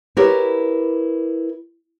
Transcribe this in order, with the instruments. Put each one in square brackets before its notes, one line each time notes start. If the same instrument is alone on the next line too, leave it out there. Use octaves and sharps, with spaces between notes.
[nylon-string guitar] E4 G4 A#4 B4 C#5